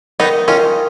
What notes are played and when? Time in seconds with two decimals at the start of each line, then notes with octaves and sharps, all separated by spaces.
0.20 D#3 B3 D#4
0.48 D#3 C#4 F4